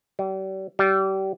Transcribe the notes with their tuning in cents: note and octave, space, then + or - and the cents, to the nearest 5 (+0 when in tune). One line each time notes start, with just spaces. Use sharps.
G3 -40
G3 -30